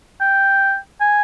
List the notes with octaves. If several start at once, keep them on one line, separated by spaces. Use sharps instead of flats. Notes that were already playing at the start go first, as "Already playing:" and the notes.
G5
G#5